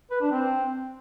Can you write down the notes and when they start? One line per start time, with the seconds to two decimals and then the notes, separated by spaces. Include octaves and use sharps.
0.11 B4
0.21 D4
0.31 C4